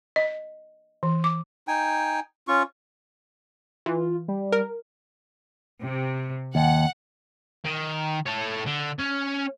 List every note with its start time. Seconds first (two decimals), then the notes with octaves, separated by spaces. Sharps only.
0.16 D#5
1.03 E3
1.24 D6
1.68 D#4 G5 G#5
2.48 C#4 F4 C#6
3.86 E3 F4
4.28 G3
4.52 A#4
5.83 C3
6.55 D#2 F#5
7.65 D#3
8.27 A4 C#5
8.67 D3
9.00 C#4